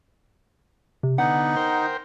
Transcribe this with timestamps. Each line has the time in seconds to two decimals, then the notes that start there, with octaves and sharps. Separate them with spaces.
1.03 C3
1.18 D3 B3 D#4 F#5
1.56 A#4 C5 G5